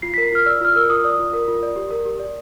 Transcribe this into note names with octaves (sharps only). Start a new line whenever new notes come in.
F4 C7
A#4 B6
F4 F6
D5 E6
F4 F6
A#4 E6
F4 D#6
D5
F4
A#4
F4
D5
G4
A#4
G4
D5